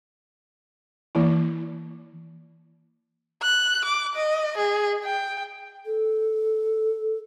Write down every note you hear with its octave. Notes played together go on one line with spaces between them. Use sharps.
E3 A#3 E4
F#6
D6
D#5
G#4
G5
A4